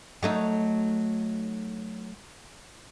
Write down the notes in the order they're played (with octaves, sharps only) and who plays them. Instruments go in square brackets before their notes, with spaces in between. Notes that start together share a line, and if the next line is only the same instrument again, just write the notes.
[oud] F#3 A3 D#4